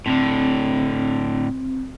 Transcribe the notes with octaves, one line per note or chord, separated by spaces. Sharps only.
A2 D3 C4